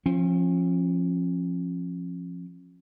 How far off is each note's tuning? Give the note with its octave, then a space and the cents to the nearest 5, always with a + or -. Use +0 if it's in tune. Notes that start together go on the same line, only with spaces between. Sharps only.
F3 +0 C#4 -40